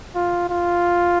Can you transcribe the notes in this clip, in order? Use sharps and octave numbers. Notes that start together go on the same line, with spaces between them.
F4
F4